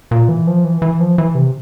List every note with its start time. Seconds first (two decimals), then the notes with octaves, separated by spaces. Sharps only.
0.11 A#2
0.29 E3
0.47 F3
0.64 E3
0.82 E3
1.00 F3
1.18 E3
1.35 C3